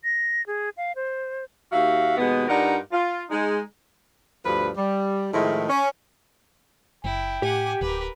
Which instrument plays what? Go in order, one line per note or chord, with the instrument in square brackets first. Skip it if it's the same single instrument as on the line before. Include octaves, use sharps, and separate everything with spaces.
[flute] A#6
G#4
F5
C5
[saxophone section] D#2 F#4 E5 F5
D#2 B2 G#3 B3
G2 D#4 F4 A#4 D5 F#5
F4
G#3 D#4
D2 G2 F3 B4
G3
A2 D#3 F3 G#3 E4
C#4
[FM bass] F#1 [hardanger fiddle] E4 [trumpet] G5
[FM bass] A2 [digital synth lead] G4 [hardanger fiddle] F#5 G#5
[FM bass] D1 [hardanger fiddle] A#4 B4